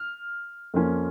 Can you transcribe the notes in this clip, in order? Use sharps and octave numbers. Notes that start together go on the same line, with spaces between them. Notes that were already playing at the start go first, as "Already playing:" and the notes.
Already playing: F6
F2 F3 A#3 C#4